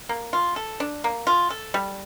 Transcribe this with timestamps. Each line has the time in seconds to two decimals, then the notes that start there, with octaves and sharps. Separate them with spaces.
0.09 A#3
0.33 F4
0.56 A4
0.80 D4
1.04 A#3
1.27 F4
1.50 A4
1.74 G3